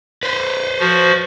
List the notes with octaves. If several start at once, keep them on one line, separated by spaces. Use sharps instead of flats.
B4 C5
F3 F#4